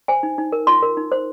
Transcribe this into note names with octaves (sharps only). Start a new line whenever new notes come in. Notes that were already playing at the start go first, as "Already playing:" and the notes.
C5 G#5
D#4
D#4
A#4
F4 C6
A#4
D#4
C5